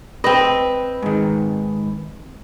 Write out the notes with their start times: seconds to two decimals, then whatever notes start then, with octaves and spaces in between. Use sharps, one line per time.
0.24 C4 B4 D#5
1.02 G#2 D#3